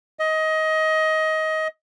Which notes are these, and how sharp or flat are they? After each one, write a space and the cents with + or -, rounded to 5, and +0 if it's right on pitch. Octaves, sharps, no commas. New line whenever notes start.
D#5 +20